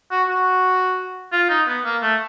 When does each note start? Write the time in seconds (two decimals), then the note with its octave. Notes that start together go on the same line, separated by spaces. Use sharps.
0.11 F#4
0.29 F#4
1.32 F4
1.49 D#4
1.68 B3
1.85 A#3
2.02 A3